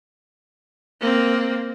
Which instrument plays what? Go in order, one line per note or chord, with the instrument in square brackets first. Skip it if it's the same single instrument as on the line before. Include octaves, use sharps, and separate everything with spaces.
[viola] A#3 C4